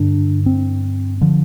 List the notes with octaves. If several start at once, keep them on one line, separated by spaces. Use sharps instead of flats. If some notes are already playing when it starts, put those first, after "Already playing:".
Already playing: G2 D3 D4
C4
D3 F3